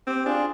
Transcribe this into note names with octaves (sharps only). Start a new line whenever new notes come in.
C4 G4
D4 F4 G#4